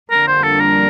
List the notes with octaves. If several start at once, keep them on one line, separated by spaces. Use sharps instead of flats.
F2 D3 G3 A#3 D4 A#4
C5
A4
A#4